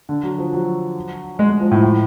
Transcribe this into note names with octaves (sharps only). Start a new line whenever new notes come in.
D3
F#3
F3
F#3
G#3
G#3
F3
A2
A2